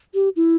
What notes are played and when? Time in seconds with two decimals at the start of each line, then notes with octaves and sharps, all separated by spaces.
0.14 G4
0.36 E4